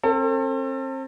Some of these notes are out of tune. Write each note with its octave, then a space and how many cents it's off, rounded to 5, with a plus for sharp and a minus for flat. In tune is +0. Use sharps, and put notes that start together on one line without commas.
C4 +35 A4 +35